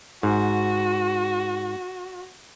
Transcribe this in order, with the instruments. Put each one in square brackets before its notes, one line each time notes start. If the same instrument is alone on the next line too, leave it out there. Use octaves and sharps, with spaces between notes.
[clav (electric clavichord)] G#2 [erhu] F#4